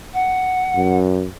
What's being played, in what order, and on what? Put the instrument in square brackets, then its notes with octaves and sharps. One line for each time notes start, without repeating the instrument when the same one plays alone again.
[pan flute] F#5
[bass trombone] F#2